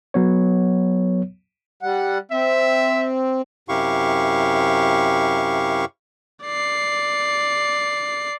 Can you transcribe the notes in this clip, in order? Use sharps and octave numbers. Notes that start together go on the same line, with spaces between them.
F#3 B3 C#5
G3 F#5
C4 E5
F#2 C3 E4 G4 F5 C#6
D5 C7